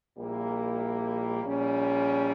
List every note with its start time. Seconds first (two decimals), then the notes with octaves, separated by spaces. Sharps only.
0.16 A#1 A#2 G3 A#3 E4
1.43 A#1 A#2 G3 C#4